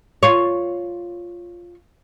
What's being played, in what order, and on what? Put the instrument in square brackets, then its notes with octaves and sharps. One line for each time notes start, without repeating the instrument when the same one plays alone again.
[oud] F4 C#5